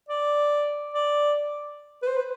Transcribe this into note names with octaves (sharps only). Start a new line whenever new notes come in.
D5
D5
B4
C5
B4